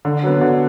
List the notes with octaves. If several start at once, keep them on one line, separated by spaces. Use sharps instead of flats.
D3
F#3 B3
D3